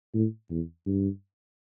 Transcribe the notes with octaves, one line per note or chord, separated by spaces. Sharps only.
A2
E2
G2